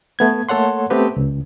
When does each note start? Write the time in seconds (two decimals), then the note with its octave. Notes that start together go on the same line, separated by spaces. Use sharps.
0.19 A3 B3 G#6
0.49 A3 A#3 A4 C#5 F#5 C6
0.90 A3 B3 C4 G4 B4
1.17 C#2